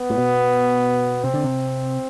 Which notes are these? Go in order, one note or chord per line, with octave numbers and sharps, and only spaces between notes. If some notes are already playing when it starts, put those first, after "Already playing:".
Already playing: B3
A2
B2
C3 C4
D3
C3